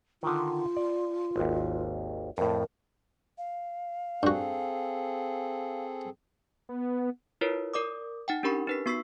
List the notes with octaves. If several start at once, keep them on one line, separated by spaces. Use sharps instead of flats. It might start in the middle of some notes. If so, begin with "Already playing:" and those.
D3 D#3 F4
D5
G#1 D#2
F2 A2 A#4
F5
G2 C4 F#4 G#4 A4
B3
E4 F4 A#4 B4 C#5
A#4 D5 D6 D#6
D#4 F#5 G5
C#4 D4 G4 A#4 B5 C#6
D#4 B4 B6
B3 F#4 C#6 E6 B6 C7